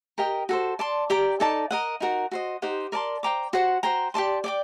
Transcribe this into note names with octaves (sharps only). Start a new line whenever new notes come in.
G4 A#4 D#5 G5
F#4 A4 C5
D5 A5 C6
G4 D5 G5 A#5
D#4 A4 D5 A5
A#4 D#5 F#5
D#4 F#4 A#4 F#5
F#4 C5 D#5
D#4 G4 C5 F#5
A#4 D5 A5 C6
C5 G5 A#5 D6
F#4 C5 F#5
F#4 C5 G5 A#5
G4 D5 A5 C6
D5 G5 D6